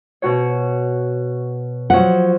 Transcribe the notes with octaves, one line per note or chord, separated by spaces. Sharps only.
B2 F#4 C#5
F3 F#3 F#5